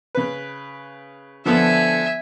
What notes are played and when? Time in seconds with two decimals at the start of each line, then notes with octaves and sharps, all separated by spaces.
0.15 C#3 B4
1.46 D3 F3 B3 E5 G#5